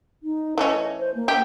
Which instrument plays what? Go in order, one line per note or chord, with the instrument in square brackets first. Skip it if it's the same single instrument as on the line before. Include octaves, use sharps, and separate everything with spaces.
[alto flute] D#4
[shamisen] E3 A3 C#4 [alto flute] D#5
[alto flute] C5
A#3
[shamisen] G4